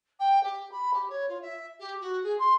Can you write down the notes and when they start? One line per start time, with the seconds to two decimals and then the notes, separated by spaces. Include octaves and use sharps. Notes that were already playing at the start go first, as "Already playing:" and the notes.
0.19 G5
0.43 G4
0.71 B5
0.93 G4
1.09 C#5
1.29 F4
1.41 E5
1.79 G4
2.01 F#4
2.23 G#4
2.39 C6